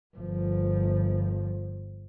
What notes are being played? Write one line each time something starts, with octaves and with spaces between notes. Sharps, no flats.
G1 F3